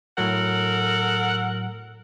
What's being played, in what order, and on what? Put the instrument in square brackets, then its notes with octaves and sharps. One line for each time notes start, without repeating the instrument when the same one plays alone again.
[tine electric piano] A2 F#3 [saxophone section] A4 A#4 F#5